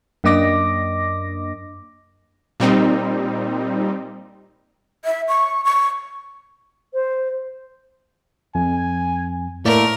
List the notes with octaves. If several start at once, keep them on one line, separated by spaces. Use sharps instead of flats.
F#2 A#3 D4 D#5 D6 A#6
A#2 G3 C4 D#4
E5
C#6
C#6
C5
F2 G#5
A2 A3 A#3 A#4 D5